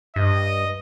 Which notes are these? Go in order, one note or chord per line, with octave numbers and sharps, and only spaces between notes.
G2 D#5